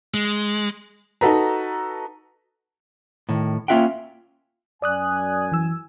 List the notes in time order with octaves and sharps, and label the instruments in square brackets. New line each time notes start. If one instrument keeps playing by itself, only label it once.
[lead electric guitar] G#3
[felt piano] D#4 F#4 A4 B4 A#5
[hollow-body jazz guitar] A2 D#3
A#3 C#4 F4 E5 F#5 G5
[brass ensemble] F#2 G#5 [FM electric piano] D5 D#6 F#6
[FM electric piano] E3 E6